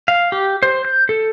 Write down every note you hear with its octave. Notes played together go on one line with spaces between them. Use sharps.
F5
G4
C5
G6
A4